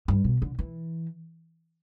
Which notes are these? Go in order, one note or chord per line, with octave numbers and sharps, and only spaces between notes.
G2
B2
D3
E3